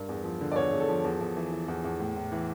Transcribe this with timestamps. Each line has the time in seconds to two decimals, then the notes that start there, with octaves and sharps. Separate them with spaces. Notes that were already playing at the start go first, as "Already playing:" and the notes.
Already playing: G2 A#4
0.09 E2
0.24 F3
0.41 D3
0.52 D5
0.56 E2 C#5
0.73 E2
0.80 A4
0.88 F3
1.04 E2
1.21 E2
1.36 E3
1.52 E3
1.68 E2
1.84 E2
2.00 A2
2.16 A2
2.32 E3